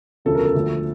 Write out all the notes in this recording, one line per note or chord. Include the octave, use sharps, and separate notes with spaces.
E1 D2 C#3 F3 A4
A#4
A4
D2 D3 F3 A3